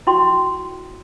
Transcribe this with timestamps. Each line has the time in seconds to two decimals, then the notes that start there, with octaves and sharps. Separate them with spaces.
0.07 E4 F#4 G5 C6 C#6